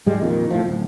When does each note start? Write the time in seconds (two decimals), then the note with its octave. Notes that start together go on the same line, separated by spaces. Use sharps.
0.06 G#2 G3 G#3
0.22 F2 A#2 D#3
0.51 F#1 A2 F3
0.65 D1